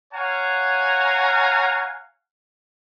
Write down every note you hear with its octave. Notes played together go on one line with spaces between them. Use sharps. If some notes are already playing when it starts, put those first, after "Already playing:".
C#5 F5 F#5 G#5 A#5